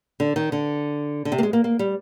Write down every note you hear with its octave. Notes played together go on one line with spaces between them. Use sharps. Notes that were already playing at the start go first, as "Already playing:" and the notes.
D3
D#3
D3
D3
C3
A#3
G#3
A#3
A#3
G3